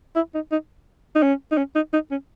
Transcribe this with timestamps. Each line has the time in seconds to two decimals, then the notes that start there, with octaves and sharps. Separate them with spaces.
0.16 E4
0.35 D#4
0.51 D#4
1.15 D#4
1.23 C#4
1.51 D#4
1.58 C#4
1.75 D#4
1.93 D#4
2.11 C#4